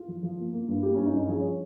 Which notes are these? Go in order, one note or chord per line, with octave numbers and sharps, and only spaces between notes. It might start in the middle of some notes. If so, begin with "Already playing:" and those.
Already playing: F4
F3
F3
A#3
A#3
G2
A#3 G4
G2 C#4
D#4
G2 C#4
F3 G#4
C#5